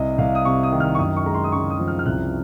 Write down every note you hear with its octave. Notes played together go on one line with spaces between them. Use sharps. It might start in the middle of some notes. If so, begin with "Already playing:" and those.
Already playing: C2 D#5
C2 F5
D#6
C3 C#6
D#6
D#3
F6
C#6
F#2 D#6
C#6
G#3 A#5
C6
D#6
C#3 C#6
D#6
F3
F6
F6
C2 F#6